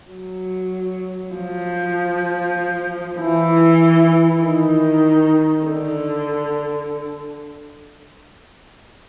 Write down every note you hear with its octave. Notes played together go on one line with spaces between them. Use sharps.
F#3
F3
E3
D#3
D3